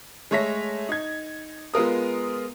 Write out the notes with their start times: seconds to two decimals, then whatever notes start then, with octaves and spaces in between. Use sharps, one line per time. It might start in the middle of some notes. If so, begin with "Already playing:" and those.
0.31 G#3 A3 C#5 E5 A#6 B6
0.89 D#4 G#6
1.74 G#3 B3 F4 A#4 D#6